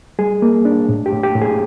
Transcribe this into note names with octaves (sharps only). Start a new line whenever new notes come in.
G3 G#4
A#3
D4
A2
G4
A2
G4
A2
G#4